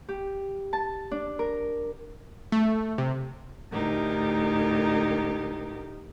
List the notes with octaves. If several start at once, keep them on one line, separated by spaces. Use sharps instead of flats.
G4
A5
D4
A#4
A3
C3
D2 A2 D#4 G4 A#4